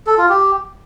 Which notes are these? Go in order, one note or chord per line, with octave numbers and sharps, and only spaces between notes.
A4
F4
G4